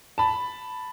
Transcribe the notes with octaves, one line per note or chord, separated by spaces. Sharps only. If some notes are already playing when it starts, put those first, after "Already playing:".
A5 B5